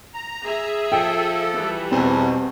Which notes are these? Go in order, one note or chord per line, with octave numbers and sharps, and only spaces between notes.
A#5
G#4 E5
F3 A4 G5
E3 G3
E2 B2 C4